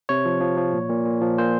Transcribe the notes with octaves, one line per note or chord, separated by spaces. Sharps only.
C3 C#5
F3
F3
F3
A#2
A#2
A#2
F3
A#2 C5